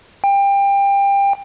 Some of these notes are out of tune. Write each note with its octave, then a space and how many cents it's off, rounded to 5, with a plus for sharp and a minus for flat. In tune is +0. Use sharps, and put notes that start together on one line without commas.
G5 +25